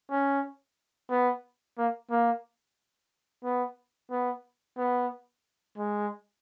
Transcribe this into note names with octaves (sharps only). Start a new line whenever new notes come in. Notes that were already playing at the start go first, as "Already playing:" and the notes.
C#4
B3
A#3
A#3
B3
B3
B3
G#3